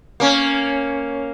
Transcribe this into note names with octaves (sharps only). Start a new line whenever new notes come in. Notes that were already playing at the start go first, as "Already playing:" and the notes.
A#3 C#4